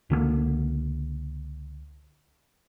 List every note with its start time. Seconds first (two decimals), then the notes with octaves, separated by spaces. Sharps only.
0.10 C#2 D3 E3 A#3